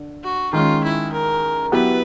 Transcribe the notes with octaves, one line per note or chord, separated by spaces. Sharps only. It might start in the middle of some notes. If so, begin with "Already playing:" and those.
Already playing: D3
F#4
D#3 G#3 C#4 F4
E4
A#4
F#3 B3 E4 G4 B4